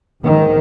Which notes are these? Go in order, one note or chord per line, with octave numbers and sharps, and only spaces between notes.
G#2 D#3